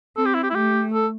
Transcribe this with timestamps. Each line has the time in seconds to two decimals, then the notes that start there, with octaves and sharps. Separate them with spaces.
0.17 C4 A4
0.26 G4
0.35 E4
0.44 G4
0.50 E4
0.55 A3 G4
0.94 A4